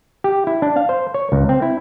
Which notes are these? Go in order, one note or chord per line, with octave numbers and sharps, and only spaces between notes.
G4
E4
D4
F5
C5
C#5
C#2
C4
E4